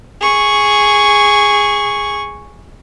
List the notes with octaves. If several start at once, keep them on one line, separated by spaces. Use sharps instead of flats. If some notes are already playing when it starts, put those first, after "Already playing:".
G#4 C#6